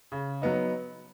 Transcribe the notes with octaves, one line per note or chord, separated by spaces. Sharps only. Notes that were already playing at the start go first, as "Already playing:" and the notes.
C#3
F#3 B3 D#4